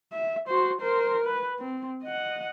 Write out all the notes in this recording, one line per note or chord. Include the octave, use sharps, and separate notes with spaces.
E5
F#4 C5
A#4 C5
B4
C4
D#5 F#5